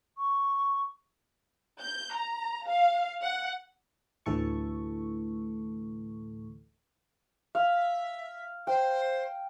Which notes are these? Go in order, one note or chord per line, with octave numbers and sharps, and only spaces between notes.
C#6
G6
A#5
F5
F#5
D2 A2 E3 A4 C#6
E5 F5
C5 G5